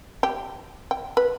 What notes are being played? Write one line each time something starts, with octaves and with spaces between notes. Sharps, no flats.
G4
G5
B4